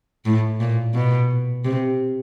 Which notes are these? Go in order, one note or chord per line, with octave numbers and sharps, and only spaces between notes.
A2
A#2
B2
C3